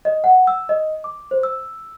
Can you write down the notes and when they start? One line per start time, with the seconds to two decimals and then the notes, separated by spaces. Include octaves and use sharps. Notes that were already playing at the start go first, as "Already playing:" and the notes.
0.05 D#5
0.24 F#5
0.47 E6
0.69 D#5
1.04 D6
1.31 C5
1.43 E6